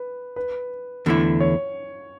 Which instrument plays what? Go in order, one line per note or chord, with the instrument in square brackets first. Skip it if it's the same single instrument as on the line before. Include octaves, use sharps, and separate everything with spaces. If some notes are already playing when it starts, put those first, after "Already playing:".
Already playing: [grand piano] B4
B4
[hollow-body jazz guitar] E2 D3 A3 E4
[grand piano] C#5